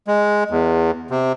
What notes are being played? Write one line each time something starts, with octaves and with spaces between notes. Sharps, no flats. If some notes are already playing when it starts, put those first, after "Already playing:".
G#3
E2
C3